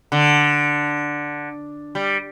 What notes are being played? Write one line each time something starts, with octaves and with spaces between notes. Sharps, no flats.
D3
G3